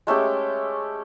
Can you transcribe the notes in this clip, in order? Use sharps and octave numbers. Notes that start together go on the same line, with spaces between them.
G#3 A3 C#4 G4